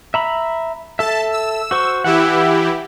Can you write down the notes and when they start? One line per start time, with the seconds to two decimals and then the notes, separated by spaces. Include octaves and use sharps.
0.14 E5 A#5 B5
0.99 A4 E5 A5
1.32 E6
1.71 F#4 C5 C#6
2.04 E3 E4 G4 F#5 E6